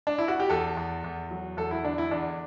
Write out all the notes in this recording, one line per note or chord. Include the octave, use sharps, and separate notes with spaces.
D4
E4
F#4
G4
E2 A4
E2
E2
F#3
E2 A4
E4
D3 D4
E4
E2 D4